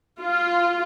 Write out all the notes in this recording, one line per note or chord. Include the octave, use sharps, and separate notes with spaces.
F4